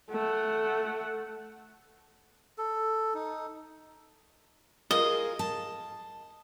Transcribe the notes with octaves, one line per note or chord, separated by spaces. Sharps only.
A3 F#5
A4
D#4
F4 G#4 A#4 D#5
A5